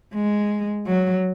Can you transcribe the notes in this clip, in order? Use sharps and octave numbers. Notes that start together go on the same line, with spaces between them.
G#3
F#3